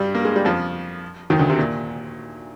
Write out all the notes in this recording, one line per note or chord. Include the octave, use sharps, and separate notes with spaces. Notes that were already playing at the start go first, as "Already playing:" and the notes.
Already playing: G2 G3
A#3
G#3
G3
F2 F3
D#2 D#3
D2 D3
C3
A#2